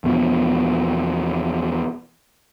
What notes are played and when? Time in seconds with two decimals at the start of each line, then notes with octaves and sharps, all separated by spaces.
0.04 E2 B2 F3